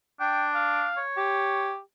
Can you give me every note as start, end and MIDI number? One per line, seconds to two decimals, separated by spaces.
0.20 0.89 62
0.20 0.48 79
0.55 1.01 77
0.97 1.70 73
1.17 1.79 67